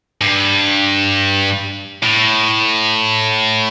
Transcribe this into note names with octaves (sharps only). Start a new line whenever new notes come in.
G2
A2